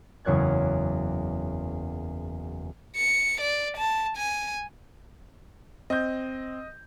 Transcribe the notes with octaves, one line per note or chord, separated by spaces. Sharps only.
F#1 E2 C#5 F#6 G#6
C#7
D5
A5
G#5
C4 D#5 G6